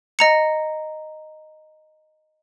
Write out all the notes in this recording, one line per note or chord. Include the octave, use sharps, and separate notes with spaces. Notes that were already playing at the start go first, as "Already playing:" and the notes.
D#5 A#5 C#7